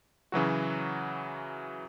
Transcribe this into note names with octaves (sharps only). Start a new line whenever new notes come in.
C#3 E3 F#3 F#4